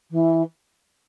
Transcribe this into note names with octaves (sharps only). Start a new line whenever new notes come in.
E3